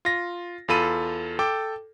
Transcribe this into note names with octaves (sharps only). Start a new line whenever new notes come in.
F4 A#6
E2 F4 A4 B5 D#7
A4 G5 D6